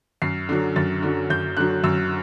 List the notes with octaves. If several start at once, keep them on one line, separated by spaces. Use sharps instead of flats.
F#2 C7
D3 F#3
F#2 A6
D3 F#3
F#2 G6
D3 F#3 F#6
F#2 E6